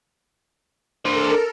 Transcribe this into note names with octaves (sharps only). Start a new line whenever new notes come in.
D4 A4 A#4 C5